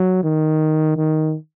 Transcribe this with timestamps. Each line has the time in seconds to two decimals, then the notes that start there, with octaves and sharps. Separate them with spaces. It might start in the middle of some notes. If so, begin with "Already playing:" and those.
Already playing: F#3
0.23 D#3
0.97 D#3